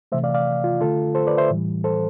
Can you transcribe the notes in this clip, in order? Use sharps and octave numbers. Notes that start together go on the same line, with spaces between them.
C3 E3 A3 C5 E5
D5 F5
D5 F5
F4
D3 A3 F4 A4
A4 C5
B4 D5
C5 E5
A2 E3 G3
A4 C5